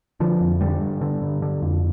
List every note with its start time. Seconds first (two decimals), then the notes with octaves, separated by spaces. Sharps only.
0.20 D3 F3
0.41 F2
0.61 D3 G3
0.81 G2
1.01 D3
1.22 G2
1.42 D3
1.62 F2